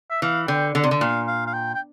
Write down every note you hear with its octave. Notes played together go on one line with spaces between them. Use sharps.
E5
E3 F5
D3 G5
D3
C3
D3
A#2 F5
F5
F5
G5
G5